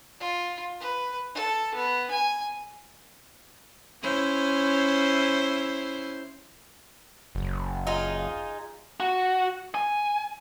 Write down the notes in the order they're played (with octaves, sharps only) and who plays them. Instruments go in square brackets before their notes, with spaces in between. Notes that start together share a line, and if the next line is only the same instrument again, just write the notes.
[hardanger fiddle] F4
B4
A4
B3
G#5
[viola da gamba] C#4 E4 C5
[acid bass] F#1
[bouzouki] D#4 F4 G#4
[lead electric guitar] F#4
G#5